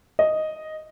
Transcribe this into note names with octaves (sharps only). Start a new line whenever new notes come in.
D#5